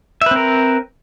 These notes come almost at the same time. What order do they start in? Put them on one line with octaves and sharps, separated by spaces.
E5 B4 C4 A#4